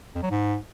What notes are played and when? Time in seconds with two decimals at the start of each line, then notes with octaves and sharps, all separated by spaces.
0.16 F2
0.23 F#3
0.30 G#2